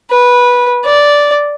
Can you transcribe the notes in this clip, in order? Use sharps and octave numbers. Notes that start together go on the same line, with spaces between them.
B4
D5